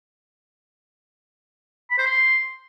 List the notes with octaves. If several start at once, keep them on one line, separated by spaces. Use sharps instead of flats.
B5
C5
C6